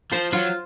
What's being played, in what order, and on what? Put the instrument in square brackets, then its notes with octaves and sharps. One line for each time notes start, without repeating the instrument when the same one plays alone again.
[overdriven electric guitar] F3 [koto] C5
[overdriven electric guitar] F#3 [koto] F4